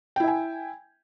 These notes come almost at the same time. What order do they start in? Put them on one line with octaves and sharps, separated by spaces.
G5 E4 E5 G#5